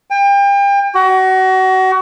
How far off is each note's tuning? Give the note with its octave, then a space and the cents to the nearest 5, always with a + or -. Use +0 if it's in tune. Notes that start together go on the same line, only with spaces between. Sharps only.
G5 +35
F#4 +30